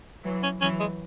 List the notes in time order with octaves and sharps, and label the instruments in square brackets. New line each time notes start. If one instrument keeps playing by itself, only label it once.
[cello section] E3 F#3
[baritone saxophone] C#4
[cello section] E3 F#3 [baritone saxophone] C#4
[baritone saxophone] G#3